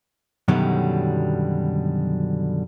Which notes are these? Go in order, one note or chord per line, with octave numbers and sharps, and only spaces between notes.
F#2 B2 D3 D#3 F#3 G3